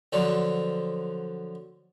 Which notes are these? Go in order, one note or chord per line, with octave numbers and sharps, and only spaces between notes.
D3 F3 F#3